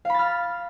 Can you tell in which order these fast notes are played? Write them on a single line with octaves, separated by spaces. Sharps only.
F5 B5 A6 F6